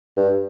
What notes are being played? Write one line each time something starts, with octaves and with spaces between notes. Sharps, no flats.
G2